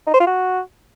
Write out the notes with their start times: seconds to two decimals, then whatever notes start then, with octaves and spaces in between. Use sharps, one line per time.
0.07 D#4
0.14 C5
0.20 F4
0.27 F#4